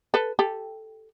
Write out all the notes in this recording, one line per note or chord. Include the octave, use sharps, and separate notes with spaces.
A4 B4
G4 A4